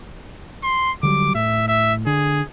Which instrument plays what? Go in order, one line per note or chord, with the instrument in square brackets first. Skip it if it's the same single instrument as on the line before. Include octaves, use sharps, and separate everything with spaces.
[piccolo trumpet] C6
[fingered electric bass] D3 F#3 G3 [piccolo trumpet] D6
[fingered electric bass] A2 [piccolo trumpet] E5
[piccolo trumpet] E5
[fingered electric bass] D3 [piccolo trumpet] G#4